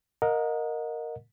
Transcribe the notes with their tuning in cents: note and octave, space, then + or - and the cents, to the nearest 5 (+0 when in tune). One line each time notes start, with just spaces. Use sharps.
A#4 +0 D#5 +0 F#5 -40